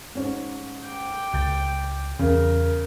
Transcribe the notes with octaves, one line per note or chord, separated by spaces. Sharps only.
G#2 C#4
G5 D6
C#2 G6 A6
E2 C#3 A#4